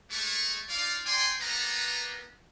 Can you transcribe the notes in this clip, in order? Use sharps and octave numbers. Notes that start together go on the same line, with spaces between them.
G#3 A3 C#6
D#4 F4 D5 F5
G3 D5 G5 G#5 C6
G3 A#3 B3 A4 B4 A#5